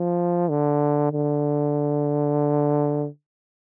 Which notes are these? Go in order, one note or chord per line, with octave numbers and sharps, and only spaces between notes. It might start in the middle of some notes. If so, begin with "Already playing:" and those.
Already playing: F3
D3
D3